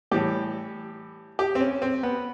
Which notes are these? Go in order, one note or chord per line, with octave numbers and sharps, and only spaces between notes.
A2 E3 G3 G4
G4
C4
C#4
C4
B3